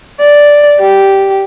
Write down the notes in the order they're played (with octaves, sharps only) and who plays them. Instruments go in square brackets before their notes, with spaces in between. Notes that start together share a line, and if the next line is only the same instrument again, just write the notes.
[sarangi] D5
G4